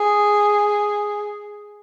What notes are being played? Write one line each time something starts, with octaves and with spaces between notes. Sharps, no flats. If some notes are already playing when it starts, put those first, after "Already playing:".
Already playing: G#4